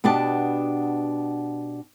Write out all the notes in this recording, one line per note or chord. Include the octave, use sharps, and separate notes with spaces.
B2 B3 D4 G4 A5